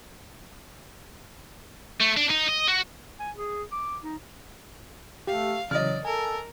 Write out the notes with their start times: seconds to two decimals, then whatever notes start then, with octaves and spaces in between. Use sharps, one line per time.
2.01 A3
2.17 D4
2.30 D#4
2.48 D#5
2.67 F#4
3.20 G#5
3.37 G#4
3.72 D6
4.03 D#4
5.27 A3 G4 F5
5.71 C#3 E3 F#3 D5 D#5 F6
6.05 A4 A#4 G#5